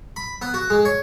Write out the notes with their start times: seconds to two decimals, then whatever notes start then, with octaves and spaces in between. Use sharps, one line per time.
0.16 B5
0.42 B3
0.54 F#4
0.70 G#3
0.85 C#5